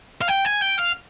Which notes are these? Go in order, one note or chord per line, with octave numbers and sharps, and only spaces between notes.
F5
G5
G#5
G5
F5